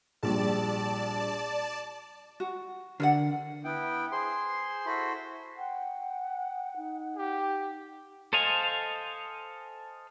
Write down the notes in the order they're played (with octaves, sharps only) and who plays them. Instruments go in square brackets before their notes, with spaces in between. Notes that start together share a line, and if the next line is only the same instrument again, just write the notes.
[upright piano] A#1 G3 [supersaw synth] D5 A5
[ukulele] F#4
[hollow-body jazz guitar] D3 [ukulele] A#4 D5 F#5
[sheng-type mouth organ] B3 E4 G5
G#4 C5 C6
E4 F#4 A4 C5 B5
[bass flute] F#5 [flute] G5
[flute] D#4
[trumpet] G4
[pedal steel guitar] A4 C5 D#5 F5 G#5